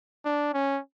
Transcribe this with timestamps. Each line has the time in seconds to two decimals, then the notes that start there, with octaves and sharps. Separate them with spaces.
0.25 D4
0.54 C#4